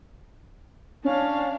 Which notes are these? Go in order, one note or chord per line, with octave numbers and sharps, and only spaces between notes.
C#4 D4 F5